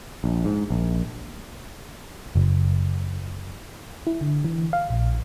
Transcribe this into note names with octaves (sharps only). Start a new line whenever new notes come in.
A#1
G#2
A#1
F#1
E4
D3
E3
F5
A#1